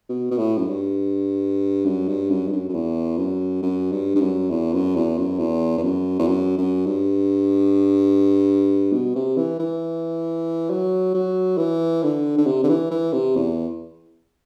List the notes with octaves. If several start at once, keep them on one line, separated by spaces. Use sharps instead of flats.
B2
B2
A2
F#2
G2
F#2
G2
F#2
G2
F#2
F#2
E2
F#2
F#2
G2
G2
F#2
E2
F#2
E2
F#2
E2
E2
F#2
E2
F#2
F#2
G2
B2
C3
E3
E3
F#3
F#3
E3
D3
D3
C3
D3
E3
E3
C3
E2